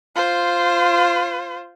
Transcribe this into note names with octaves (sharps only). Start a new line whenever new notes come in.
F4 C5